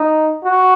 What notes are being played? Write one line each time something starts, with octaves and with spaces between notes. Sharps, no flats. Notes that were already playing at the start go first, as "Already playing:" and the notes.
Already playing: D#4
F#4